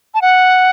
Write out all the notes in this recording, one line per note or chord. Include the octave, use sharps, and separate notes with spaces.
A5
F#5